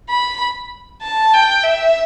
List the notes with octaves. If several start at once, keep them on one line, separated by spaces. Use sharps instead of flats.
B5
A5
G5
E5